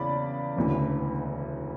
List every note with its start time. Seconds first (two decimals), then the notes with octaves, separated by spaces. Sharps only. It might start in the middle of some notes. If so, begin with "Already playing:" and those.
Already playing: E2 C#3 D5 B5
0.56 E1 D2 C#3 E3